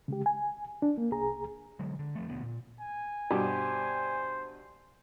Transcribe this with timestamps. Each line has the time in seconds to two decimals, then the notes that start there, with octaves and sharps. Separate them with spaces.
0.08 C#3 G#3 G4
0.26 G#5
0.82 D4
0.98 A#3
1.12 C2 G#4 A#5
1.79 D3 F#3 G#3
1.99 D3
2.15 F1 F3 A3
2.28 E1 D2 B3
2.42 A#2
2.80 G#5
3.31 G2 B2 G4 C5